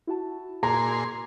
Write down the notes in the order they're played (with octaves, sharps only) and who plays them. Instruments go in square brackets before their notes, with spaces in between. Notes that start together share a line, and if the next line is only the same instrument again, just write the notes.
[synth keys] E4 F#4 A5
[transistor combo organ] A#2 G#4 C6 [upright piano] A#5